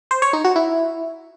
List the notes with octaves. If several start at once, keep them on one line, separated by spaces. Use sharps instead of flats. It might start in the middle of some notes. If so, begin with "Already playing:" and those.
C5
C#5
D#4
F#4
E4